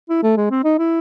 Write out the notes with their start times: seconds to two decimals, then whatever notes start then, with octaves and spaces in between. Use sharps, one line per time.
0.10 E4
0.23 A3
0.37 G#3
0.51 C4
0.64 D#4
0.79 E4